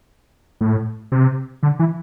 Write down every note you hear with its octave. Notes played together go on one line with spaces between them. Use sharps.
A2
C3
D3
E3